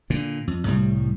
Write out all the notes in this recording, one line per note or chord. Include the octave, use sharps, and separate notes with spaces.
A#2 D3
F2
C2 A2 G3